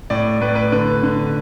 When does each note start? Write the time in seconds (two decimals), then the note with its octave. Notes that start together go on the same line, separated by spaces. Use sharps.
0.10 A2 D5
0.41 A2 B4
0.48 D5
0.55 B4
0.72 D3 B4
1.03 D3